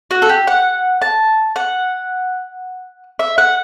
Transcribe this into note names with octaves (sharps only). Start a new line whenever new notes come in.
F#4
A4
G4
F#5
A5
F#5
E5
F#5